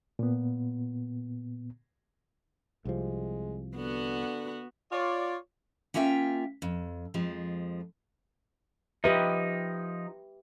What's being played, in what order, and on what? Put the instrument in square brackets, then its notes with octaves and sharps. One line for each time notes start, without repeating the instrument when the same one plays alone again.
[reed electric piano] A#2 B3
[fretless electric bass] C2 C3 F3 [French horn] G#3
[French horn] D3 [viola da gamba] B3 F#4
[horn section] F4 C#5 D5
[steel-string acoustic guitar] A#3 C#4 F4 E5 F5 G5
F2
F2 F3 G#3
[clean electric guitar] F3 D#4 [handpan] G4 B4 E5